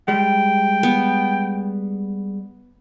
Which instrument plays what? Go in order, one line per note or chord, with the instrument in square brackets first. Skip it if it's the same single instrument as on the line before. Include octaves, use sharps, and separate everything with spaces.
[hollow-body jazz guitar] G3 G#3 [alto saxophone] G5
[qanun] B3